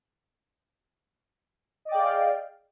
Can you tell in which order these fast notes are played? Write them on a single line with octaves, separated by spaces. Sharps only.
D#5 D5 G5 G#4 F5